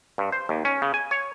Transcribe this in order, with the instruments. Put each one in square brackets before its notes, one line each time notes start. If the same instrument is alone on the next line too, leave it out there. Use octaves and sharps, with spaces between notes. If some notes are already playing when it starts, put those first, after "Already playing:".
[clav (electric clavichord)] G2
C5
D#2
C#4
C#3
G#5
C#5